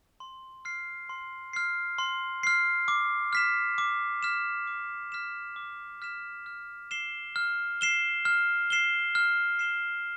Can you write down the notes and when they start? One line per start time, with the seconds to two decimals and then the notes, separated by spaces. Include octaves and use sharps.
0.20 C6
0.65 F6 C7
1.09 C6
1.53 F6 C7
1.99 C6
2.43 F6 C7
2.88 D6
3.33 F6 B6 E7
3.78 D6
4.23 F6 B6 E7
4.67 D6
5.12 F6 B6 E7
5.56 D6
6.02 F6 B6 E7
6.46 F6
6.91 C7 E7 G7
7.36 F6
7.81 C7 E7 G7
8.25 F6
8.70 C7 E7 G7
9.15 F6
9.59 C7 E7 G7